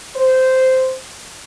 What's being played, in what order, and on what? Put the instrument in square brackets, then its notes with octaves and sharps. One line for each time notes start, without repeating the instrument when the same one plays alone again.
[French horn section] C5